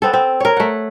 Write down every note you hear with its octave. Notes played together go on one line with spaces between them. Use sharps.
B3 C4 A4
C4
A#4 C#5
A3 F#5